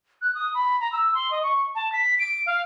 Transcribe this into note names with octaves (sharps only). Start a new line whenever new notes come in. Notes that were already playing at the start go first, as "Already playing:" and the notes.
F#6
D#6
B5
A#5
E6
C6
D#5
C#6
A5
B6
D7
F5